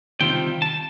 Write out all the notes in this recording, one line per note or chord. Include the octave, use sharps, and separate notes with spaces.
C3 D#3 G3 C4 F4 G5
A5